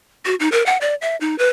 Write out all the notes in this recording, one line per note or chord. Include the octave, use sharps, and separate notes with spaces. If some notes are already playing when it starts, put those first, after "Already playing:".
F#4
D#4
A#4
F#5
D5
E5
D#4
B4